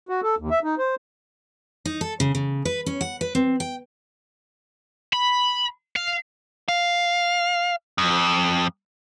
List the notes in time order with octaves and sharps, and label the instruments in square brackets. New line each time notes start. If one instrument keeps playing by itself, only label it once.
[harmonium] F#4
A4
D#2
E5
D#4
C5
[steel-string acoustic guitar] D#4
A4
C#3
C#3
B4
C#4
F#5
B4
C4
G5
[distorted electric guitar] B5
F5
[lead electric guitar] F5
F2